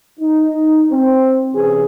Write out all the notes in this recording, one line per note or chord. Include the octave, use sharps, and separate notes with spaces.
D#4
C4
C3 E3 C#4 G#4